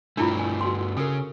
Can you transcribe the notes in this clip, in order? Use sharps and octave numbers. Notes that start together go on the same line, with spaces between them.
G2 A3 D4 E4 F4
G#5
F#4 C6
C#3 A4 A#4